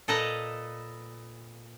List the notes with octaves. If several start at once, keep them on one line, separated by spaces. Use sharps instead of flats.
A#2 A4 B4 D#5 A5 A#5